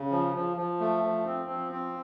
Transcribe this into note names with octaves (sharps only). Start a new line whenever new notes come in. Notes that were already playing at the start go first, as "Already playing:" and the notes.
Already playing: C#3
F3
F3
F3
A3
F3
C4
F3
C4